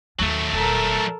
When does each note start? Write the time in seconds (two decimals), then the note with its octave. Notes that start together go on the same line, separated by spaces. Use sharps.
0.19 D#2 D#3 F#3 A3
0.53 D#1 A4 A#4